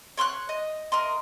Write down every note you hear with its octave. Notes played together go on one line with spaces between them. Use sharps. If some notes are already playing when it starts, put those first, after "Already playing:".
C#5 C6 F6 F#6
D#5
A#4 D#5 C6